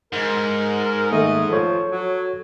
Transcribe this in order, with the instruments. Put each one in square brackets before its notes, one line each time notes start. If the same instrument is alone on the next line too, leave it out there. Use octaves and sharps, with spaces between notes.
[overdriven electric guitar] G#2 [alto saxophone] A#4
[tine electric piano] D#3 A3 A#3 [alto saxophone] D#5
[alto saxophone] F3 [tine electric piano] A4 C#5
[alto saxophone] F#3